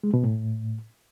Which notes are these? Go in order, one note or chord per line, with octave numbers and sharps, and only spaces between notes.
G#3
B2
A2